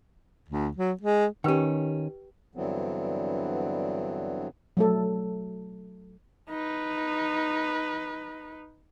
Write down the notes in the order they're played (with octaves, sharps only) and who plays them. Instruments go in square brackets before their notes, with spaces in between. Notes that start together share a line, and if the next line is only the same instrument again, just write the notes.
[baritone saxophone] D2
F#3
G#3
[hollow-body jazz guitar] D#3 C#4 [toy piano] G4 B4 G5
[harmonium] G2 D3 E3 F#3 B3 C4
[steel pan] F#3 A3 A4
[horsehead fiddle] D#4 B4